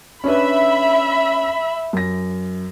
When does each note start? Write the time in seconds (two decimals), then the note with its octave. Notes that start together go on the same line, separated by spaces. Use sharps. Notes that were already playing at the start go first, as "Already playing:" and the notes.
0.24 C#4 D4 B4 E5 B5
1.93 F#2 A#6